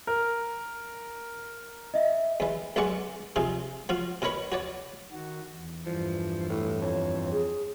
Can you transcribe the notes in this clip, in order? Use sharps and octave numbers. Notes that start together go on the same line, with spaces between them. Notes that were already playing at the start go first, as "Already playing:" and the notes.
A#4
D#5 E5
E2 E3
B1 B2 G#3 D5 F#5 C#6
C3 F3 D#4 G#4
F3 F#4 F5
B2 A#4 C#5 B5 C#6
F#4 C#5 D5
D#3 F#4
E2
E2 G2 E3 F3
A2
F2 C#5
G#4